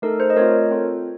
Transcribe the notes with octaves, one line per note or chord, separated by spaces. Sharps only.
A3 D#4 A4 A#4
C5
D#5
A3 C4 F4 A#4 C#5
C4 F4 A4